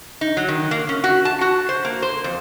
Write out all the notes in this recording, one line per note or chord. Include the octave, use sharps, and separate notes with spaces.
D#4
F#3
D#3
A#3
C#4
F#4
A5
F#4
C5
A#3
C5
F2